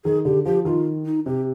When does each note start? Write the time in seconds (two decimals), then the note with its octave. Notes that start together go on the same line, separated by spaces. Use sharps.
0.05 D#3 G#4
0.25 D3 G4
0.45 F3 G4
0.65 D#3 F4
1.06 D#4
1.26 C3 G4